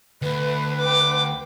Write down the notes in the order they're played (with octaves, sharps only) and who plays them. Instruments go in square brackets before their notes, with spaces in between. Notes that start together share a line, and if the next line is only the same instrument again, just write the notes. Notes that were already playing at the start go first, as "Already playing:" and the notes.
[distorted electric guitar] D2 [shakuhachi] B4
[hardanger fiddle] G5 D6